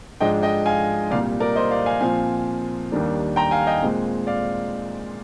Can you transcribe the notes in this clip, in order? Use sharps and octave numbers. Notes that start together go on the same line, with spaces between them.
G#2 F3 G#3 D4 D#5 G5
D#5 G5
F5 G#5
C2 A#2 G3 D5 F5
A#4 D5
C5 D#5
D5 F5
F5 G#5
A#2 F3 C4 F5 G#5
D#2 D#3 G3 A#3 D4
G5 A#5
F5 G#5
D#5 G5
A#2 G#3 C4
D5 F5